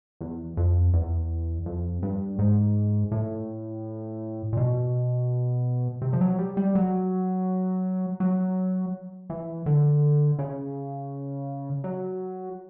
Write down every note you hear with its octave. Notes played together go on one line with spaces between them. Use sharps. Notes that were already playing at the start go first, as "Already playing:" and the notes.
E2
F2
E2
F2
G2
G#2
A2
A#2
B2
C3
F3
F#3
G3
G3
F#3
F#3
E3
D3
C#3
F#3